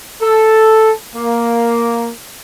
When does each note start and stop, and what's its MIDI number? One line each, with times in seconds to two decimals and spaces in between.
0.22 0.91 69
1.15 2.09 58